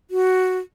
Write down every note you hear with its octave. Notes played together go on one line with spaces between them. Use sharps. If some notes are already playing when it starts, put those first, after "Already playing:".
F#4